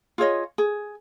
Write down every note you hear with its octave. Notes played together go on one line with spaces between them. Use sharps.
F4 G#4 C#5 D#5
G#4